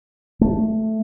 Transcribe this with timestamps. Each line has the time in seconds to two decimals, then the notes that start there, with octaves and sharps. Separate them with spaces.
0.41 A3